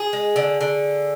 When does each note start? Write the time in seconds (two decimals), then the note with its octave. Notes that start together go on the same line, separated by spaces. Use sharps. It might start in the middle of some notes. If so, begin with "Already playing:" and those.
Already playing: G#4
0.13 G#3
0.36 D3
0.61 D3